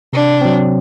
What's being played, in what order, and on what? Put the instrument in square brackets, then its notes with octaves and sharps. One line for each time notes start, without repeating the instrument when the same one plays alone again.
[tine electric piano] C3 [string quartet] D4
[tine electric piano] F#3 C4